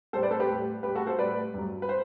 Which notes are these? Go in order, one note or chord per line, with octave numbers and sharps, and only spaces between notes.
A2 G3 A4 C5
B4 D5
A4 C5
G4 B4
A2 G3
A2 G3 G4 B4
F#4 A4
A4 C5
A2 G3 B4 D5
G2 F#3
B4
C5